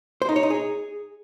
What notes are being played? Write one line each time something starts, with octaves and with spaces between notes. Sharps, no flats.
C5
D#4
C#5
D#4
G#4